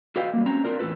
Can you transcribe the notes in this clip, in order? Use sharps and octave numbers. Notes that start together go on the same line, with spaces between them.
F#4 A4 B4 D#5 F5 G5
G3 A#3
C4 C#4 A#5
C4 D4 D#4 F4 A#4 D5
E2 A2 A4 B4